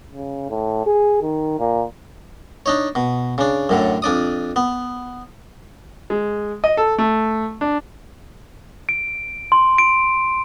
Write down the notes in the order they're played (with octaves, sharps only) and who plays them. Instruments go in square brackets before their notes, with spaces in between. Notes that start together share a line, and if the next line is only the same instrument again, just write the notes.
[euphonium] C#3
A2
G#4
D#3
A#2
[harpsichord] D4 D#4 C#5
B2
C#3 D4
F#2 A2 D3
F2 D4 D5 D#6
B3
[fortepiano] G#3
D#5
A4
A3
D4
[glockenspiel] D7
C6
D7